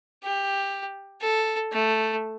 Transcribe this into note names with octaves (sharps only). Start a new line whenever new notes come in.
G4
A4
A3